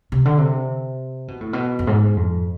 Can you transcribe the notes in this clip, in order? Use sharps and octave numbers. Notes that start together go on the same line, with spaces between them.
C3
D3
C3
B2
A2
B2
F2
G#2
F2